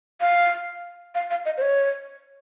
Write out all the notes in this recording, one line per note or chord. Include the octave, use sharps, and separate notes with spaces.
F5
F5
F5
D#5
C5
C#5